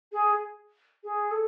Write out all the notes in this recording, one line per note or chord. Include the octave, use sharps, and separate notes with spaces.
G#4
G#4
A4